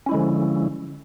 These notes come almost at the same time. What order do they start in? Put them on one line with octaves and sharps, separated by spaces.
C#4 E4 G#3 D3 F3